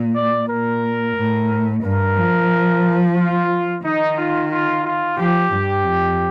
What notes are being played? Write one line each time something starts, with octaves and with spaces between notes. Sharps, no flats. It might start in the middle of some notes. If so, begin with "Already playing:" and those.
Already playing: A#2
D5
A#2 A#4
A2
G2 A#4
F3
F4
D#3 D#4
F4
F4
F4
F3 G4
G2
F2